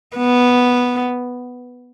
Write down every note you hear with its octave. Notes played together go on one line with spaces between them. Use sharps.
B3